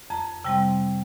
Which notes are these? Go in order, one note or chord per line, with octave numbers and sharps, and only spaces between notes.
F2 A#5
C3 G3 C4 G5